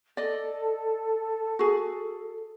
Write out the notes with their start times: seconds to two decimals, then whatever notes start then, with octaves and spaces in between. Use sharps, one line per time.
0.17 A4 D5 D#5
1.59 F#4 G#4